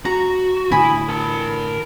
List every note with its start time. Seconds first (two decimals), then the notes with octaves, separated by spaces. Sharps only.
0.05 F#4 A#5
0.71 A2 D3 E3 E4 G#5 B5 D#6
1.09 A#4 A5